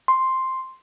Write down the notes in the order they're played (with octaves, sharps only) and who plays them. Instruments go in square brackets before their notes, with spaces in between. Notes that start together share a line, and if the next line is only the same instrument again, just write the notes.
[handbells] C6